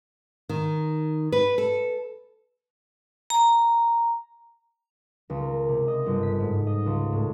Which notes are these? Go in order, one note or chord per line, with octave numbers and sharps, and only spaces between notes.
D#3
B4
A4
A#5
C#2
A#4
C3
D#5
G1
B6
G#2
D#5
C#2
A2